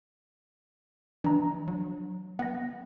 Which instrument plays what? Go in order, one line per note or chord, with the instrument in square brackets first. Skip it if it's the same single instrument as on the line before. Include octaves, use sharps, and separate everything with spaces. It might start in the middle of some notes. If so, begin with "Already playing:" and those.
[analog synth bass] E3 [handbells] D4 A#5
[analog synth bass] F#3
[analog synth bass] B3 [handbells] F#5 A#6